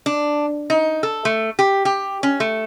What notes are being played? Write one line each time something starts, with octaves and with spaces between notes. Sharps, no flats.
D4
D#4
A4
A3
G4
G4
C#4
A3